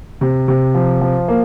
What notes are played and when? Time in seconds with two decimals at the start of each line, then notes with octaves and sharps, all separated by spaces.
0.21 C3
0.48 C3
0.75 F3
1.01 F3
1.28 A#3